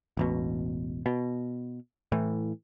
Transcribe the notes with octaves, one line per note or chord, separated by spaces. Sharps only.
E1 A1 B2
B2
A2 E3